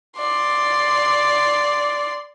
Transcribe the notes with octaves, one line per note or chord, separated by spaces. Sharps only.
D5 C6